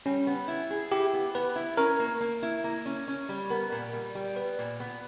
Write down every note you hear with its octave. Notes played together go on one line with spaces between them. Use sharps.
G3 C#4
B3
E4
G#4
E4 G4
B3
B3 B4
E4
C#4 A#4
A#3
A#3
E4
A#3
C#4
C#4
G3
B3 A#4
A#2
G3
G3
B3 B4
A#2
B3